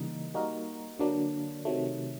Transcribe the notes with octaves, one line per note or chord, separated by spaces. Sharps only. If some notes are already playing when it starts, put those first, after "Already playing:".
Already playing: C#3 E3 G3 A#3 D#4
G3 A#3 D#4 F#4 A#4
D3 F#3 A#3 D4
C3 D#3 F#3 A3